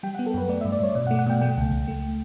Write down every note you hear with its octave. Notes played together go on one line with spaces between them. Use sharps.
G3 G5
B3 F#5
A4
F#2 B4
A3 D5
G2 E5
D5
G2 C#5
B2 D5
F#5
A3
F#5
B2 G5
A3 G5
C#2
C#2
A3